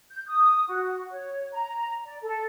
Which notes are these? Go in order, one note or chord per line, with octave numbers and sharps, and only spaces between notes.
G6
D#6
F#4
C#5
A#5
D5
A4